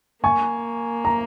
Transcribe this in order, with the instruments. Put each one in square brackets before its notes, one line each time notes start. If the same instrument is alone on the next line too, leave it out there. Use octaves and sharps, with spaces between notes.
[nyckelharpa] A#3 [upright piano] G#5 C#6
[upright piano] A#5